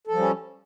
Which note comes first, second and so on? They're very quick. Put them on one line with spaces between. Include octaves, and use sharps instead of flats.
A4 F3 G3 C#4